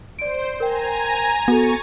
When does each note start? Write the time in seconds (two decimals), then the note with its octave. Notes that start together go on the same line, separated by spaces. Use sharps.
0.19 C5 D5 D7
0.60 A#4 G5 G#5 A#5
1.48 B3 F#4 A4 C#6 A6